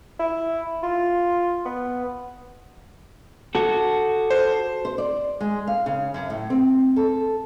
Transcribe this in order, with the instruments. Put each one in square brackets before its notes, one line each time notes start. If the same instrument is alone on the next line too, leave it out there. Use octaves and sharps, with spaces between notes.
[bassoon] E4
F4
B3
[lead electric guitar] F#4 A4
[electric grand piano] C5
[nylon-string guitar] C5
D5
G#3
F5
C#3
F#2
A2
C4
A4